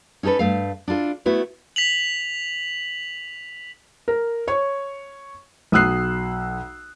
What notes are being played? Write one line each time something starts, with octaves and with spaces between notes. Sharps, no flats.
C#4 D#4 G#4 A4 B4
G2 A3 F5
D4 E4 F4 A4
A3 B3 E4 F#4 B4
B6 F7 F#7
A#4
C#5 C#6
B1 D#6 E6 F#6 C7